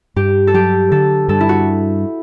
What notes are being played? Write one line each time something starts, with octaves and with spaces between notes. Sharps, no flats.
G2 G4
A4
F#3 G4
D3 A4
G2 A4
E4
F#4